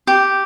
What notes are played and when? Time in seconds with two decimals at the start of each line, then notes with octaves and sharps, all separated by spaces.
0.07 G4